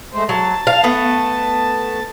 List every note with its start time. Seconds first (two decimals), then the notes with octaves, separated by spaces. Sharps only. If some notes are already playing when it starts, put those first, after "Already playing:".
0.13 G#3 A3 C5
0.29 F#3 A5
0.67 F5
0.83 A3 B3